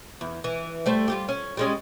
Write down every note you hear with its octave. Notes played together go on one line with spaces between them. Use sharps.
E2
E3
G3 A3 C5
G3 F4 G4
C#4
G3 G#3 C#4